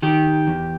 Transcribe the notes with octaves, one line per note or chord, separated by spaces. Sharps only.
D#3 G4
E2